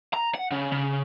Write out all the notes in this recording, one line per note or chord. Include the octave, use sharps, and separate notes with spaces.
A#5
F#5
C#3
C#3